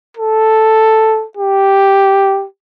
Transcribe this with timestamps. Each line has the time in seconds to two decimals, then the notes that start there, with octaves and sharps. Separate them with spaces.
0.17 A4
1.37 G4